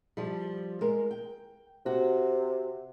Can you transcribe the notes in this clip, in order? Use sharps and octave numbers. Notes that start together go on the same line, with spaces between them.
F3 G3
G#3 A#4
G5
C3 F#4